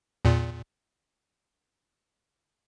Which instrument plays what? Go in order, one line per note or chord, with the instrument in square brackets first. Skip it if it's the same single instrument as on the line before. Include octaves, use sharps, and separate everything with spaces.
[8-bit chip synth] E2 A#2